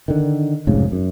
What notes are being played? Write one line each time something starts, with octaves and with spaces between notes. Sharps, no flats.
D3 D#3
F1 G#2 C#3
F#2